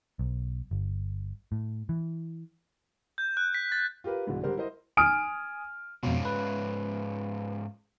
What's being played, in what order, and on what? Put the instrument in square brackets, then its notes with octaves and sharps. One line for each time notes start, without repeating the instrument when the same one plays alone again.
[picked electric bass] B1
G1
A2
E3
[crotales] G6
F#6
B6
A6
[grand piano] F4 G4 A#4 B4
C2 G#2 B2 D3 E3
D3 G3 G4 A#4 C5
E4 A#4 C5 D#5
[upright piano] G#5 D#6 F6 D7
[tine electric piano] F2 B2 [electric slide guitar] G#2 C#4 F4
[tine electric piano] B4